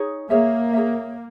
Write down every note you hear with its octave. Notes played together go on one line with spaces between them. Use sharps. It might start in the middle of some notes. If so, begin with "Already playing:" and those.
Already playing: D#4 G#4 C#5
A#3 G#4 C#5 E5
G#4 C#5 E5